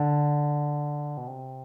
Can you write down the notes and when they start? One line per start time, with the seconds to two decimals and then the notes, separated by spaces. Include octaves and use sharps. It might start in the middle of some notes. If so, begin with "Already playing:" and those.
Already playing: D3
1.17 B2
1.27 C3